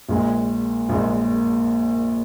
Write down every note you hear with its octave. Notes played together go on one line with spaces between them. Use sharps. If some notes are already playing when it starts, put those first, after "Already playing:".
A#1 A#2 G#3
A#1 A#2 G#3